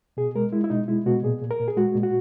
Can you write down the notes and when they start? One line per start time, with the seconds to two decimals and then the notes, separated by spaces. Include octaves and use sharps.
0.17 B2 G#4
0.35 G#3 A#4
0.52 G#3 E4
0.64 E4
0.70 B2 D#4
0.88 G#3 E4
1.06 B2 F#4
1.23 A#2 G#4
1.41 A#2
1.51 A#4
1.59 A#2
1.68 G#4
1.77 G#3 F#4
1.95 A#2
2.03 F#4